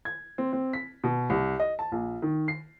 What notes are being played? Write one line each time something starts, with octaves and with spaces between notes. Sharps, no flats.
G#6
C4
C4
B6
B2
C2
D#5
A5
A#1
D#3
C7